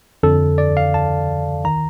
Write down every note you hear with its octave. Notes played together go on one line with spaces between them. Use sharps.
F2 D3 A4
D5
F5
A5
D#3 A#5